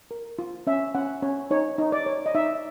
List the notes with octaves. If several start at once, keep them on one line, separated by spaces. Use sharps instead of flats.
A#4
F4
C#4 E5
C#4 F#5
C#4 C#5
D#4 C#5
D#4
D5
C#5
D#5
D#4 E5